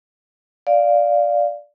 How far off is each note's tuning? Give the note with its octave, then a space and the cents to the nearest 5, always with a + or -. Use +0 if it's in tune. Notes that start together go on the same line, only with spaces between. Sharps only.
D5 +0 F5 +0